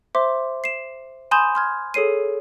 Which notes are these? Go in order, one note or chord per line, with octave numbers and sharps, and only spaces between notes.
C5 E5 C6 D6
C7 E7
G#5 B5 C6 D#6 G6 E7
C6 F6 G#6
G#4 A4 C#5 C7 D#7